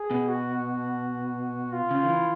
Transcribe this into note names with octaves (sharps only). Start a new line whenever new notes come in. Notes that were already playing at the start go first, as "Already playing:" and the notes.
Already playing: G#4
B2
F#4
F4
C#3
D#3
E3